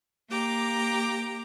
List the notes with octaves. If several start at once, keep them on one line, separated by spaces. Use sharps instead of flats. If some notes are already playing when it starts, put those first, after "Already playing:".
A#3 G4 A#5 D6